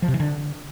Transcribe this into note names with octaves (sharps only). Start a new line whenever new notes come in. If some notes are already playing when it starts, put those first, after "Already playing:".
F3
C3
E3
D3